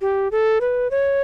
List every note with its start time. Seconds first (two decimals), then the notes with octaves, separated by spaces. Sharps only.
0.01 G4
0.32 A4
0.61 B4
0.91 C#5